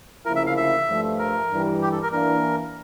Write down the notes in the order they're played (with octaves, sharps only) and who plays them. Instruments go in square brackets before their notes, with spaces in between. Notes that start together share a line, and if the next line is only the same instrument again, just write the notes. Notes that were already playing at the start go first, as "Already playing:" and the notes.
[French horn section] D2 C#3 F3 A#3 E4 [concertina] A#4
[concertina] E5
F5
E5
[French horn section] G2 F3 A3
[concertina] A#4
[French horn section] G2 E3 G3
[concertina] G4
A4
A#4
[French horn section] E3 A#3 D4 [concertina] A#4